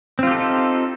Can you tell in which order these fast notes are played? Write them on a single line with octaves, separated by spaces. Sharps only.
C4 F4 G4 A4 D#4